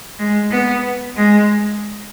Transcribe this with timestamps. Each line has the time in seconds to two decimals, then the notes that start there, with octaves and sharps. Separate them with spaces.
0.19 G#3
0.50 B3
1.16 G#3